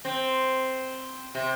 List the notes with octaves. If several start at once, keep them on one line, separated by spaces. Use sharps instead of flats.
C4
C3